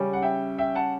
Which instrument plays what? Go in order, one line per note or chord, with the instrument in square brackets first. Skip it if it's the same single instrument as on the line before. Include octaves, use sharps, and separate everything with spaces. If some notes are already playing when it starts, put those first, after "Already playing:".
Already playing: [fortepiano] C#3 G3 C#4
[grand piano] F#5
E5 G5
E5 G5
F#5 A5